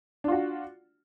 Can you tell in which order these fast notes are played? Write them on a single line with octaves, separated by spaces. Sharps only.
D4 F4 F#4